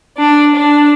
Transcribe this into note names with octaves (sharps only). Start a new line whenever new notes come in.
D4
D4